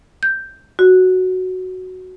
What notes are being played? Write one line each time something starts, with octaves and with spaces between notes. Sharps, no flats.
G6
F#4